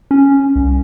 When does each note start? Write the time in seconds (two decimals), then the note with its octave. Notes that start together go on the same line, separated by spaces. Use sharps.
0.11 C#4
0.56 C2